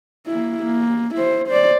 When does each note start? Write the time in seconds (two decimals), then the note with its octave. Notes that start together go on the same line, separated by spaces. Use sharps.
0.27 A#3 E4
0.63 A#3
1.15 E4 C5
1.48 C5 D5